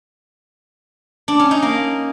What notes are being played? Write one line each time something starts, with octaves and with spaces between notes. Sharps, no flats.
D4
C#4
D#4
A#3